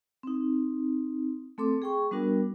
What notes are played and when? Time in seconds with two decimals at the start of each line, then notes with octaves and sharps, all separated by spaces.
0.23 C4 D#4
1.58 A3 C4 A4 C6 D6
1.82 G#4 G5 C#6
2.11 G3 B3 D4 F#4 A#4